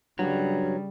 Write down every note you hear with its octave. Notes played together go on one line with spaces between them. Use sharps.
G2 C#3 F#3 G3